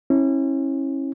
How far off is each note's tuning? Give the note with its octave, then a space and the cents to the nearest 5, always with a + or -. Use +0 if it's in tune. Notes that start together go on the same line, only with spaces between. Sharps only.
C#4 -30 E4 -20